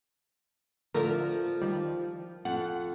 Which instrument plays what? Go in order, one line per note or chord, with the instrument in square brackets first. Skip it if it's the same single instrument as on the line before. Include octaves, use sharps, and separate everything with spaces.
[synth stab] D3 A3 A#4 [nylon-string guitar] F3
[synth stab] D#3 G3
[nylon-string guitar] F2 [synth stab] F#5